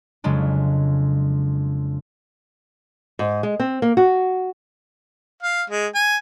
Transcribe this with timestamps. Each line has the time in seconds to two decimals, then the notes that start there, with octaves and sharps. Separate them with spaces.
0.24 F2 C#3 F#3 G#3 D4
3.19 G#2
3.43 G#3
3.60 C4
3.82 A#3
3.97 F#4
5.42 F5
5.70 G#3
5.95 G#5